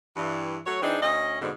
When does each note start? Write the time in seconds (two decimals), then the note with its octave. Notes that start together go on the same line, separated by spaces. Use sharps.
0.17 G2 E3
0.67 F#3 A3 C#5
0.82 E3 C4 D4 D#4 G#4
1.02 D2 C#4 D#5
1.41 F2 G#2 B2 D3